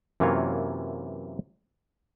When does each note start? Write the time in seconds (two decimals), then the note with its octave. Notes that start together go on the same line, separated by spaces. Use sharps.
0.20 F#2 C3 E3 A#3 F4 C#5